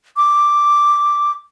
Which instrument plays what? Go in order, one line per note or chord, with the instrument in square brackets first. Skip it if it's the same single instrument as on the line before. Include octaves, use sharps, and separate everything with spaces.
[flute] D6